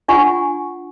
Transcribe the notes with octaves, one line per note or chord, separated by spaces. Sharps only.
D4 F4 F#5 G#5 C#6